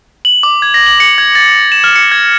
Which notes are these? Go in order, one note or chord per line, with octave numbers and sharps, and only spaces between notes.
F#7
D6
G#6
A#6
F#7
C#7
G#6
A6
E7
F6
C#7
G#6